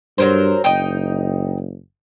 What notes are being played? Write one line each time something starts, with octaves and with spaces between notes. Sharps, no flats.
G2 F#3 A#4 C5
F#1 D#4 G5